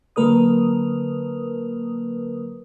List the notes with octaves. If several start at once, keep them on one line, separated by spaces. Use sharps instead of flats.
D3 F#3 A#3 A#4 B4 D#6